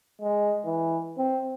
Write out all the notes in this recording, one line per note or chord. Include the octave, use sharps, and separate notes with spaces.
G#3
E3
C4